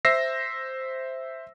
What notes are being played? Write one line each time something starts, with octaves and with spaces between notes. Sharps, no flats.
C5 E5 E6 A#6 C7